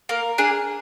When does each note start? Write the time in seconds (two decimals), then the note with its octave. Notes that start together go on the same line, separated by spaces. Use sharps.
0.09 A#3 A#4
0.38 D4 G#4